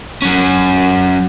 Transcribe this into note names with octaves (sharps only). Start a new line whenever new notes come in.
F#3 C#4